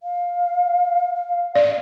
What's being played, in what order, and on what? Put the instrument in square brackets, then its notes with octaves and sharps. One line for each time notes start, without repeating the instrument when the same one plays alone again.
[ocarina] F5
F5
[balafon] D5